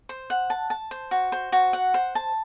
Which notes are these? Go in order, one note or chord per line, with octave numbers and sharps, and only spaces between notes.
C5
F#5
A5
A5
C5
F#4
C5
F#4
F#5
C5
A5